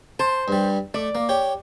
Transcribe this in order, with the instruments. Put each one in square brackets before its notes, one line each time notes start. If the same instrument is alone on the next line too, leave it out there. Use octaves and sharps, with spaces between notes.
[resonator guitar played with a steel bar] C5 [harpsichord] A5
[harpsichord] G2 G3
[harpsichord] A3 [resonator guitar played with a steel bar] D5
[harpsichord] A#3
G4 C#5